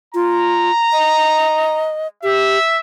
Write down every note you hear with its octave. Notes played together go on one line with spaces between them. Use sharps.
F4 A#5
D#5
G4 E5